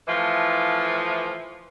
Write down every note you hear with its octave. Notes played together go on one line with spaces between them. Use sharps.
A2 E3 F3